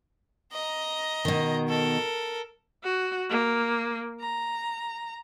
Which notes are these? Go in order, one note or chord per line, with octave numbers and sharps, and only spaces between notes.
D#5 A#5
B2 D#3
A4 A#4
F#4
A#3
A#5